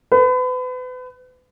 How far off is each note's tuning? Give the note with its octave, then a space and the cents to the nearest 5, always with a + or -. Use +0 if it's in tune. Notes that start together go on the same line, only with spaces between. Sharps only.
B4 +35